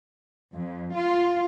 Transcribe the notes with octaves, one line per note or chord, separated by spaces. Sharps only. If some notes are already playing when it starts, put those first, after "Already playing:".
F2
F4